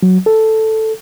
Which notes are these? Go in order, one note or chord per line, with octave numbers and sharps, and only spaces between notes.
F#3
A4